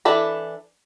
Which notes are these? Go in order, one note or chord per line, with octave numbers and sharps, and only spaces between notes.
E3 D4 A4 B5